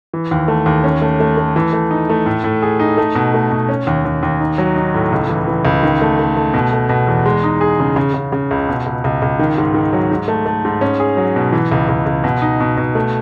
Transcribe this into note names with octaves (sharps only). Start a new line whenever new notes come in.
E3
D#2
A3
D#2
C#4
A3
A3
A3
E3
A3
D#4
A3
A2
A2
G#4
D#4
A3
B2
A3
B2
C#4
D#2
D#2
D#2
D#4
F#3
D#4
A2
C#2
E3
E3
C#2
D#3
A3
A3
A3
B2
A3
B2
E2
G#3
D#4
G#4
C#3
C#3
C#3
C#3
C#2
B2
C#2
C#2
C#2
D#3
G#2
D#3
F#3
G#2
A3
A3
G#2
C#4
G#4
F#3
B2
E3
C#2
C#2
C#2
B2
D#4
B2
B2
A3